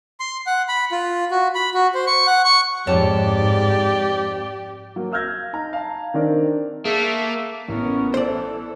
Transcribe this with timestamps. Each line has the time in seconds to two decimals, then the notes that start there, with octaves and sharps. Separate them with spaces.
0.20 C6
0.47 F#5
0.68 B5
0.92 F4
1.31 F#4
1.55 B5
1.74 F#4
1.94 C5
2.07 C#6
2.27 F#5
2.45 C#6
2.87 F2 G#2 G4 C#5 D5 A5
4.96 F#3 A#3
5.12 F5 E6 F6 G6 G#6 A#6
5.53 D#4 A#5
5.73 F5 A5 A#5
6.14 D#3 C4 D4 A#4 D5
6.85 A3 A#3 G#4 E5
7.68 A1 B3 C#4 A#4
8.14 E3 A4 C5 D5